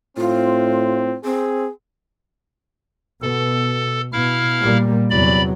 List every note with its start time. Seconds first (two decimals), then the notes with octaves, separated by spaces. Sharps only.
0.17 A2 C4 F4
1.25 C4 G#4
3.22 B2 A4
4.13 B2 E4 F5 F6
4.61 A#2 G3 A#3
5.10 E2 C3 F#3 D5 B5